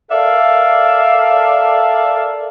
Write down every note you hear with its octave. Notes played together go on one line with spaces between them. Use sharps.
A4 A#4 D5 E5 F5